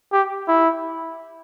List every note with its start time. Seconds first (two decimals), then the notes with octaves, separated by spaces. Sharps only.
0.12 G4
0.48 E4